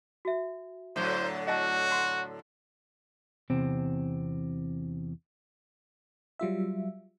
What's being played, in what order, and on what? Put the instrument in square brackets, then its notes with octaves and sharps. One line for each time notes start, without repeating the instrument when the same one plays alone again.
[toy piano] F#4 E5
[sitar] A2 D3 F#3 [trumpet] C5
[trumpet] F#4 [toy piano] D#5 A5
[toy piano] F#5 C6
[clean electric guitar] E2 C3 C4
[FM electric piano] F#3 G3 F4 E5